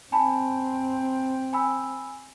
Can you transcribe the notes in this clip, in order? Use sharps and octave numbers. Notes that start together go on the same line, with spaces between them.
C4 G#5 A5 B5
G#5 B5 E6